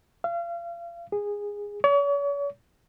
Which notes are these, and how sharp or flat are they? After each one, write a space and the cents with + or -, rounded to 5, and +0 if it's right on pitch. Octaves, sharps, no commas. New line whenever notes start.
F5 -35
G#4 -15
C#5 +40